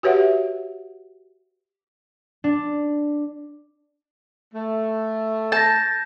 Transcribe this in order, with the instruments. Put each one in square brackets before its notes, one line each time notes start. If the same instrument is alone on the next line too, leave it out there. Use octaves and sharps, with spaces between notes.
[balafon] F#4 G4 B4 C#5 E5 F#5
[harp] D4
[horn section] A3
[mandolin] A5 [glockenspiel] G6 A#6